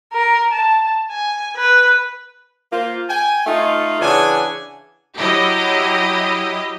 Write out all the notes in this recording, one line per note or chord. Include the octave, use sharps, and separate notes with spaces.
A#4
A5
G#5
B4
A#3 F4 C5
G5 G#5
A3 D#4 F4
C#3 E3 D4 G#4 F#5 G#5
F#3 E4 G4 D#5